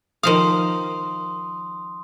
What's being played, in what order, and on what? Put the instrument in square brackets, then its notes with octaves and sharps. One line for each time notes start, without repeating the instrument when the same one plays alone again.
[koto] D#3 F3 F5 [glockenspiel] C6 D#6